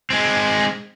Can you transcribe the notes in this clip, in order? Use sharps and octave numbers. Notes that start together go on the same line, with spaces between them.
G#3 C4